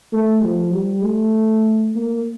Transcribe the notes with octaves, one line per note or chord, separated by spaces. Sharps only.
A3
F3
G3
A3
A#3